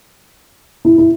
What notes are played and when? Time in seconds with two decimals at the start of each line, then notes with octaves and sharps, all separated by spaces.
0.85 E4
0.98 E4